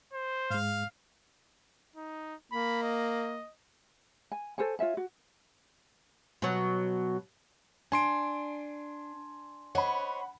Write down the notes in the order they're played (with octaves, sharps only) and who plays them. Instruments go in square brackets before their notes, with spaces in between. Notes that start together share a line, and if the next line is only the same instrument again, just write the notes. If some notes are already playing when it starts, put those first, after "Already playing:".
[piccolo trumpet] C5
[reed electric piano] G#2 G#3 [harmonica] F5
[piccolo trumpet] D#4
[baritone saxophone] A#3 [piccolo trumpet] B5
[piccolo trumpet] D#5
[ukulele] G#5
A4 C5 C#5 G#5
F4 C#5 E5 G#5
F#4
[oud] B2 F#3
[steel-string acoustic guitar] D4 [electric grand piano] G#5 C6 D7
[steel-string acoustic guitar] C5 C#5 D#5 [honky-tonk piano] F#5 B5